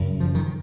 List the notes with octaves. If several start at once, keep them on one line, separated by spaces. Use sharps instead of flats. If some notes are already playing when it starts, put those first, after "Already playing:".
Already playing: F#2 C#3
F3
D#3